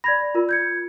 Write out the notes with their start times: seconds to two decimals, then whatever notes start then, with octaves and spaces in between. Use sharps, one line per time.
0.04 D5 B5 G#6 A#6
0.21 D5
0.35 F4 A#4
0.49 G6 G#6 C#7